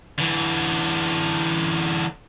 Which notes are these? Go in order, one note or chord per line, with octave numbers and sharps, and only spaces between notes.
D3 E3